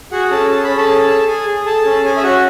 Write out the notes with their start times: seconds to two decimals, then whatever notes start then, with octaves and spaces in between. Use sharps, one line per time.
0.12 F#4 G#4 F#5
0.31 C#4 A4 A5
0.51 G#4 A5
0.64 B5
0.70 C#4
0.77 A4 A5
0.89 G#4
1.09 G#4
1.27 G#4 G#5
1.47 G#4
1.66 G#4 A4 A5
1.86 C#4
2.04 C#4 G#4 G#5
2.17 E5
2.24 C#4 F#4 F#5